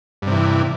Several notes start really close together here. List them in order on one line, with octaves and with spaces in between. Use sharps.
G2 C3 E3